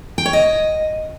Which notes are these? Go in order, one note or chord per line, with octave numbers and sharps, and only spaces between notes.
G5
C#5
D#5